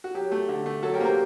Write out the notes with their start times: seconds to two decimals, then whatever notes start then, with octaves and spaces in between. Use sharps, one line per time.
0.04 F#4
0.15 F#3 G4
0.32 A3
0.49 D3
0.66 A3
0.83 F#3 F#4 A4
0.94 G4 A#4
1.00 A#3 C5
1.05 G4 A#4